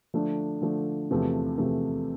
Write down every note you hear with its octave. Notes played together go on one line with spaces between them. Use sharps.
D3 F3 A3 D4
D3 F3 A3 D4
E2 C3 F3 A3
E2 C3 F3 A3